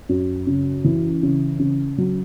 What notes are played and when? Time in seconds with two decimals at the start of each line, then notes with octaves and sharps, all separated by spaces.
0.09 F#2
0.47 C#3
0.84 E3
1.23 C#3
1.60 C#3
1.98 F#3